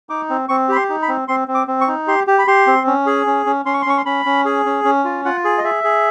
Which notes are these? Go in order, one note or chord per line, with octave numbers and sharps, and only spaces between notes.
D#4 D6
C4
C4 C#6
G4 B5
C6
D#4
B5
C4
C4 C6
C4
D6
C4
C#6
D#4
G4 C6
G4
B5
G4 C6
C4
C#4
G#4
C#4
C#4
C#4 C6
C#6
C6
C#4 C#6
C6
C#4 B5
C#4
G#4
C#4
C#4
F4
F4 F#5
G#4
D#5
G#4 E5
G#4